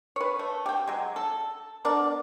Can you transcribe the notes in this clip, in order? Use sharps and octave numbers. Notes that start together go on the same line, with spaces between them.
B4 C#5
A3
G4 G5
F#3 G#3
A4
B3 D4 A#4 D5